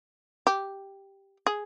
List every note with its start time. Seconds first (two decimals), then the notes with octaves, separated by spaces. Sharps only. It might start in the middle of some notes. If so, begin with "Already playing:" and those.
0.47 G4
1.46 G#4